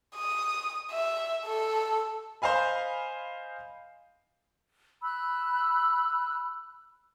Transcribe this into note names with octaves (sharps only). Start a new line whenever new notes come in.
D#6
E5
A4
C5 D#5 F5 G#5 B5
B5 E6 F#6